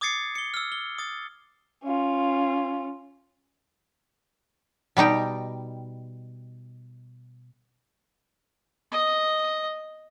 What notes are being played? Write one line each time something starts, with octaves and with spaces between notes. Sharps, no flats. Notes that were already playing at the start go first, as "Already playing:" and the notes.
D6 D#6 G#6 A6 C7 C#7
C#7 G7
E6 F6
G7
D#6 A6
C#4 F4
B2 G3 D#4 G5
D#5